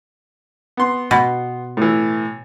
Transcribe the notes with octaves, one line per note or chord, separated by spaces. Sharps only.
B3 C6
B2
A2 E3